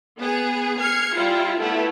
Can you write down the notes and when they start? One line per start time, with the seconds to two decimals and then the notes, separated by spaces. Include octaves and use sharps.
0.18 B3 G#4
0.80 F6 G#6 C7 C#7
1.15 G3 E4 F4
1.59 A3 B3 E4